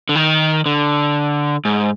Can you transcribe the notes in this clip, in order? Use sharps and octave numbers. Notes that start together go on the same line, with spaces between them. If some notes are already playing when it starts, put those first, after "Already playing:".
D3
D#3
D3
G#2